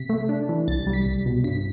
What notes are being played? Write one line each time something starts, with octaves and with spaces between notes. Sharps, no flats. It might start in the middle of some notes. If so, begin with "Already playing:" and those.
Already playing: C3 B6
A3
D4
E3
C2 A6
G3
B6
C2
B2
G2 B6